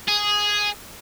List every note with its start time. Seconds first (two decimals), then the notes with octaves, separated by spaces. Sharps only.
0.08 G#4